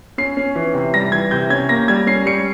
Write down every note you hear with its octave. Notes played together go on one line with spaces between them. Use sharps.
C#4 C7
C#4
E3
C3
G3 A#6
E3 G#6
C3 G6
C#4 G#6
A#3 A#6
G3 G#6
C#4 C7
G3 C#7